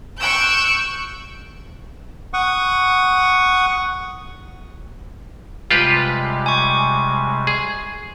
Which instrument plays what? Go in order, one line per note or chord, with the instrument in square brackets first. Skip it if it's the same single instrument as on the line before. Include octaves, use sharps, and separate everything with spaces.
[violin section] C#6 E6 F#6 G6 D7
[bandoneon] F#5 C#6 D#6
[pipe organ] C3 G3 G#3 [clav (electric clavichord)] F4 G4 B4
[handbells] G#5 C#6
[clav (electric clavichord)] G#4